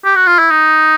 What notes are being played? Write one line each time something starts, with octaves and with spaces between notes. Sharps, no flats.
G4
F#4
F4
E4
D#4